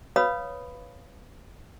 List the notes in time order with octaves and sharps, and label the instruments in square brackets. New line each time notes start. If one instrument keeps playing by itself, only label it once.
[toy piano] B4 C#5 F5 B5 D#6